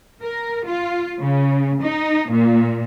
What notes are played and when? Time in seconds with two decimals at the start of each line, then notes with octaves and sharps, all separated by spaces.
0.21 A#4
0.66 F4
1.21 C#3
1.83 D#4
2.32 A#2